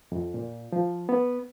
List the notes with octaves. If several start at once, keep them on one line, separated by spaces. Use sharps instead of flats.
F2
A#2
F3
B3